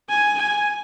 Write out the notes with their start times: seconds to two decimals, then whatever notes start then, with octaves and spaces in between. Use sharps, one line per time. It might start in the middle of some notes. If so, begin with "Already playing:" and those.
0.09 G#5
0.38 G#5